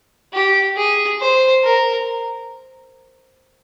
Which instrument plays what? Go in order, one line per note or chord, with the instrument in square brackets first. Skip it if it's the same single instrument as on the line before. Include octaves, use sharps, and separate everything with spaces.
[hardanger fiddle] G4
G#4
C5
A#4